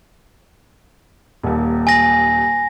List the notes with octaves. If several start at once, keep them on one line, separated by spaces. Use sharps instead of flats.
D#1 D#2
G#5 A#6